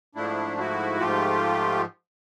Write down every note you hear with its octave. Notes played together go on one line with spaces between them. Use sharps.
G#2 F3 A3 D4 E4
E4 F#4
G#2 F3 A3 F4 G4